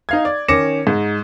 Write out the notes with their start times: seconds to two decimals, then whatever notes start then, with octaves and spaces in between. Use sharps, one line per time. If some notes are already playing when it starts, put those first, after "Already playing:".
0.09 D#4 F5 G#6
0.25 D5
0.48 D#3 C#4 D6 A#6 C#7 E7
0.87 G#2